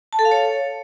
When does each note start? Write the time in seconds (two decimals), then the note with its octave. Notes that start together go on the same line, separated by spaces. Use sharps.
0.13 A5
0.19 A4
0.25 F5
0.31 C#5